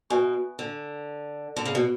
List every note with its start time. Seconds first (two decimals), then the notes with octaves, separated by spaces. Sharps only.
0.10 B2 B4 E5 G#5 C#6
0.59 D3
1.56 D3
1.65 C#3
1.75 B2